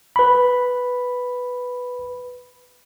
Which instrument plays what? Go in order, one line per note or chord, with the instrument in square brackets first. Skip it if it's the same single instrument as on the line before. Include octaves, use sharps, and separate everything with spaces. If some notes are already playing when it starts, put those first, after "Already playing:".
[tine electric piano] B4 B5